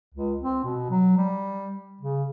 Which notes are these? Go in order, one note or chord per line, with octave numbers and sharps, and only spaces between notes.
C#2
C4
B2
F#3
G3
C#3